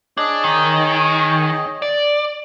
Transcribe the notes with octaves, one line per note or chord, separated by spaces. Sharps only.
D4 G#4 C#5 D#5
D#3
D5